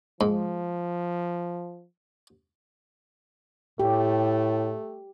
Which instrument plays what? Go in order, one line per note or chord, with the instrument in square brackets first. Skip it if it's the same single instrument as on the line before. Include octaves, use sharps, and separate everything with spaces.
[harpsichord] G#2 [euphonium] F3
[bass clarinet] A2 [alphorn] A3 [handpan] G4